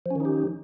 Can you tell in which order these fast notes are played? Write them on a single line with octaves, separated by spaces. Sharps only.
F3 C#4 D#3 D#4 G4